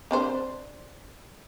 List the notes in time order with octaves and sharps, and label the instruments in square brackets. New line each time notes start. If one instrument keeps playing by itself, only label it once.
[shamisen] C4 D4 C5